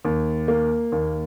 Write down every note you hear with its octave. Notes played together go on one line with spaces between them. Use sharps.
D#2
A#3
D#2